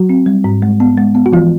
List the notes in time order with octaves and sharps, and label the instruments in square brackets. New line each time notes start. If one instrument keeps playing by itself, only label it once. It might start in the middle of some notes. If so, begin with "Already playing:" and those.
Already playing: [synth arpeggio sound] F#3 F#4
[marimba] C4
G3
G#2
G#3
B3
G#3
B3
[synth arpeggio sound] F#4
[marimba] E3 [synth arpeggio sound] F3 F4